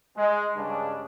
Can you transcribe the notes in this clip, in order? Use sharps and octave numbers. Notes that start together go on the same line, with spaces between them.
G#3
G2 C#3 G#3 C#4 D4 G#4